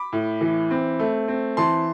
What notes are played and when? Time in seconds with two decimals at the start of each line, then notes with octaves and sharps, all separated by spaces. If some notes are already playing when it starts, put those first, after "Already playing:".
Already playing: B5 D6
0.13 A2
0.41 E3
0.71 C4
1.00 A3
1.28 C4
1.57 E3 A5 C6